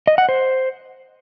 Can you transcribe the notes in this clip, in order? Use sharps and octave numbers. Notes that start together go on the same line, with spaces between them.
D#5
F#5
C5